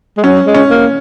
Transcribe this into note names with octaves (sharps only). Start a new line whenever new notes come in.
G#3
F#3 C#4
G#3
C#4
A#3